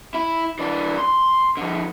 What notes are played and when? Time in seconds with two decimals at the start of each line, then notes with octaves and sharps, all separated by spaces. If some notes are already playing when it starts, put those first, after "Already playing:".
0.14 E4
0.59 E3 D4
0.98 C6
1.57 D3 F3